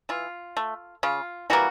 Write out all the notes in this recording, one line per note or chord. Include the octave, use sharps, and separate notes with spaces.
E3 F4
A3
C#3 F4
E3 G3 A#3 F#4